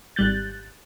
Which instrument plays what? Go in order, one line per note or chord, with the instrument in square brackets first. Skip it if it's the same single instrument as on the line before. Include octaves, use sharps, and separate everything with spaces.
[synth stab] G#1 G3 F#6 G6 A6